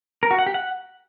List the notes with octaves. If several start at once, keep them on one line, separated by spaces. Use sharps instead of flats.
A#4
F#4
F#5
G4
F#5